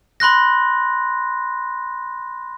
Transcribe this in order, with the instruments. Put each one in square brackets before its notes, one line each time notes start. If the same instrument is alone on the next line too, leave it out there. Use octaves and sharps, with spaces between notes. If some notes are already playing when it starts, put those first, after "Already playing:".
[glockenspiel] B5 C6 F#6 A#6